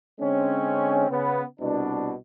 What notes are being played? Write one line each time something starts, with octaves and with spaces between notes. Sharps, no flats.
D3 G#3 C4 C#4
C#3 B3
C2 B2 D4